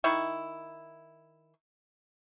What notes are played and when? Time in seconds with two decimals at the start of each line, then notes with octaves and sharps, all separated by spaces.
0.04 D#3 E4 C#6